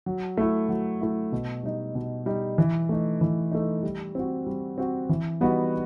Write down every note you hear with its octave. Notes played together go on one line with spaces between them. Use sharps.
F#3
A3 E4
F#3
A3 E4
B2
G3 D#4
B2
G3 D#4
E3
A3 D#4
E3
A3 D#4
G3
C4 F#4
G3
C4 F#4
E3
G3 B3 D#4 F#4